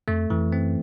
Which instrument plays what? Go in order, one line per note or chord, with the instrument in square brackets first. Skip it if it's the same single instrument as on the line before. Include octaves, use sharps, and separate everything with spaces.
[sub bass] F2 [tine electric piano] A3
[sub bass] F2 [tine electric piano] E3
[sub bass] F#2 [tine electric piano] C4